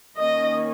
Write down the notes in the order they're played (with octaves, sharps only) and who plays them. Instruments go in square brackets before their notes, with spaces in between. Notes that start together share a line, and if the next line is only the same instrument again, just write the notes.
[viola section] D#3 A#3 C#4 D#5